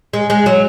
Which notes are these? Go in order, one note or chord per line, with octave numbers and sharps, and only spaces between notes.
G#3
G#3
F#3